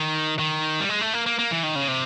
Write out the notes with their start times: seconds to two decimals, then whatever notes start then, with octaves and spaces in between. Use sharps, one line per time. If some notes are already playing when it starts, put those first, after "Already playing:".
Already playing: D#3
0.39 D#3
0.80 G3
0.89 G#3
1.01 A3
1.14 A#3
1.26 A#3
1.39 A#3
1.51 E3
1.63 D#3
1.76 C#3
1.88 C3